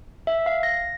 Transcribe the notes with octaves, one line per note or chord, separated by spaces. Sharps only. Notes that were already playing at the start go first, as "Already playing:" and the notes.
E5
F5
A#6